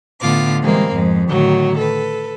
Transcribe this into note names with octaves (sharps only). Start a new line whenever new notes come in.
A2 D3 B3 F4 D6
E3 G3 G#3 A#3 C4
F2 G#2 G#3
A2 D3 D#3 F#3
A4 B4